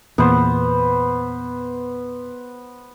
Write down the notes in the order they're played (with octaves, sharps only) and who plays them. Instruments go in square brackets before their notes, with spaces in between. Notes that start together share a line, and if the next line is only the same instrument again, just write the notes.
[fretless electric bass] E2 A#2 [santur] B3 B4 C5